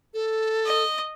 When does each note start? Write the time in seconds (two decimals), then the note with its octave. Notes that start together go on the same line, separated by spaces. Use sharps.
0.14 A4
0.65 D#5